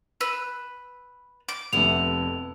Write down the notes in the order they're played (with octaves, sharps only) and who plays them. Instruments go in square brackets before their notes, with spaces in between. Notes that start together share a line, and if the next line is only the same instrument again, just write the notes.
[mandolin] B4 E6
D6
[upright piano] F1 F2 [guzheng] B3 E4 [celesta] F7